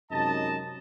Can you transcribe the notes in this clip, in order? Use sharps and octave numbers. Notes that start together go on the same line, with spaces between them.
F#2 C3 G#3 D#4 D#5 A5